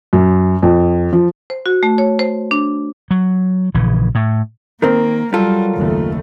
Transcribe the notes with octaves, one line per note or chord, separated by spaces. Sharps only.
F#2
F2
F3
C5
F#4
A3
C#5
C5
D4
F#3
A#1 C#3 E3
A2
D#3 A#3 C4 A#4
F#3 G3 F4 A4
F#1 D#2 C#3 A3